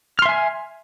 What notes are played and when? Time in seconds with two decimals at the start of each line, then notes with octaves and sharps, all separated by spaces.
0.19 F6
0.22 C6
0.26 E5
0.29 G#5